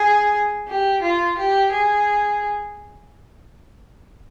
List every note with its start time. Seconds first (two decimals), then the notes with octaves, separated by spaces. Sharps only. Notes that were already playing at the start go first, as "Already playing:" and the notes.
Already playing: G#4
0.67 G4
1.02 F4
1.38 G4
1.71 G#4